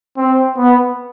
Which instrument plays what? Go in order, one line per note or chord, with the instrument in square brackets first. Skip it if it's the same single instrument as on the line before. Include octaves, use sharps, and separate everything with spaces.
[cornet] C4
B3